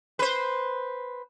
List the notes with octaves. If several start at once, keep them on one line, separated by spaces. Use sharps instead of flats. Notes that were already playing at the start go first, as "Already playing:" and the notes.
B4 C5